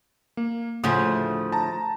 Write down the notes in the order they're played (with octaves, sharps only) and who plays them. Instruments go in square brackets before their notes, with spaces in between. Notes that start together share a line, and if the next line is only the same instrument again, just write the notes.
[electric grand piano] A#3
[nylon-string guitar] D2 A2 F#5 [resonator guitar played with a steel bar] C#3 F3 [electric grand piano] D#6
[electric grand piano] A5 A#5